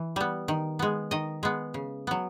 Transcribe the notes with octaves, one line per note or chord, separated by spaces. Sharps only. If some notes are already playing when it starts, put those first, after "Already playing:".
Already playing: E3
G3 B3
D#3
G#3 B3
D#3 D#5
G#3 B3
C#3
F#3 B3